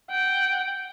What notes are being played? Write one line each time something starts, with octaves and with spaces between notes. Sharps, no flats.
F#5 G5